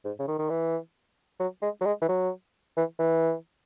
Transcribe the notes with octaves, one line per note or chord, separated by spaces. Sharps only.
G#2
C#3
D#3
D#3
E3
F#3
G#3
F#3
G#3
E3
F#3
E3
E3